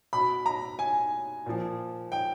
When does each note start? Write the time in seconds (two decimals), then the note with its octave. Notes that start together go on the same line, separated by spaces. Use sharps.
0.13 B2 B5
0.46 A#5
0.79 G#5
1.46 A#2 F3
2.12 G5